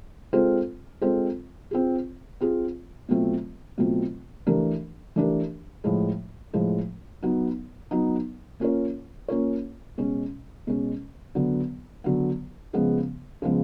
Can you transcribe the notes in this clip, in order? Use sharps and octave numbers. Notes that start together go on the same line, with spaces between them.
G#3 C4 F4 A4 C5
G#3 C4 F4 A4 C5
C4 F4 G#4
C4 F4 G#4
B2 F#3 A3 C4 F4
B2 F#3 A3 C4 F4
E3 A3 D4 G4 A#4
E3 A3 D4 G4 A#4
A2 F3 G#3
A2 F3 G#3
F#3 B3 D#4
F#3 B3 D#4
A#3 C#4 F4 A#4 C#5
A#3 C#4 F4 A#4 C#5
B2 G#3 C#4
B2 G#3 C#4
D3 F#3 B3
D3 F#3 B3
C#3 F3 G#3 B3
C#3 F3 G#3 B3